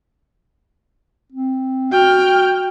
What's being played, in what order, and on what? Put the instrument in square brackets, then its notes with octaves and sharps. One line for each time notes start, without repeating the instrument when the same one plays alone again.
[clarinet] C4
[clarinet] F#4 [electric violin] G5 F6